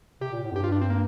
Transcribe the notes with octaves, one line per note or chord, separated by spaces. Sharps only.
C3 G4
A#2
A2
F2
G2 G4
F4
D4
C4
A#3